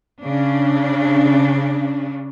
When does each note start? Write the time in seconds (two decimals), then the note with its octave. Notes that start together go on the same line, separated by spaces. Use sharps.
0.23 C#3 D4